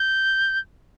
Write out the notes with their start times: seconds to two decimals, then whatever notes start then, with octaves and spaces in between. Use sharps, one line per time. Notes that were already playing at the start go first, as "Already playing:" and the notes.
Already playing: G6